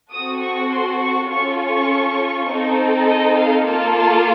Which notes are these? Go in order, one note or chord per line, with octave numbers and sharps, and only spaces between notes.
C4 F#4 A4 D#6
C#6
C6
C#6
C#4 F4 A4 C#6
C#6
C4 D#4 A4
D#5
F5
A#3 F4 A4 A5
A5